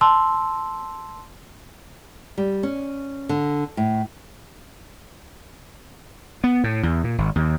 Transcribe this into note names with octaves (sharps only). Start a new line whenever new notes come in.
A5 C6 E6
G3
C#4
D3
A2
B3
A2
E2
A#2
G#1
D#2